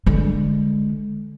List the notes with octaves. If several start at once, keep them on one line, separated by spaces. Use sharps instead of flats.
D3 G#3